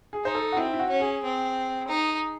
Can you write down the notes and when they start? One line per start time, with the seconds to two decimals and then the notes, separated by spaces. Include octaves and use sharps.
0.13 G#4
0.25 D#4 C5
0.35 A4
0.52 F#4
0.57 C4 E4
0.73 E4
0.79 F#4
0.89 C#4
1.00 G#4
1.23 C4
1.88 D#4